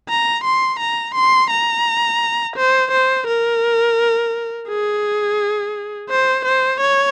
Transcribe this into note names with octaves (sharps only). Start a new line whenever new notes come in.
A#5
C6
A#5
C6
A#5
C5
C5
A#4
G#4
C5
C5
C#5